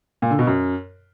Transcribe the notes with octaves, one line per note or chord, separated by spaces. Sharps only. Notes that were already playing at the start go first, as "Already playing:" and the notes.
A#2
D3
B2
F#2